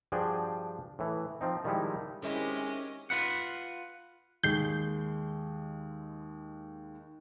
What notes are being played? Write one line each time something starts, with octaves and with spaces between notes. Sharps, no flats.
G2 F3 D4 F#4 G#4 G5
A2 E3
F3 C4 D#4
D#3 F3 G3 G#3 D#4 E4
D#3 G#3 C4 C#4 E4 G4 D#5
F4 B4 F#5
D#2 G#3 G6 C7